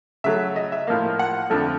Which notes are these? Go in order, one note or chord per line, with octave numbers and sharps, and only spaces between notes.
C#3 F#3 A3 E5
D#5
E5
A2 F3 A#3 F5
F#5
F2 D3 F3 A3